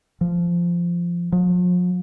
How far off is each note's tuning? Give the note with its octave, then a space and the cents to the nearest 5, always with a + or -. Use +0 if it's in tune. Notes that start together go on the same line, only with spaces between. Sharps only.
F3 -15
F3 +40